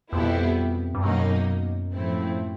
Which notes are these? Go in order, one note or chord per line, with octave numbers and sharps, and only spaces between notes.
F2 B2 G3 B3 E4 G4
G2
F#2 B2 F#3 A#3 D#4
A2 F3 A3 C4 E4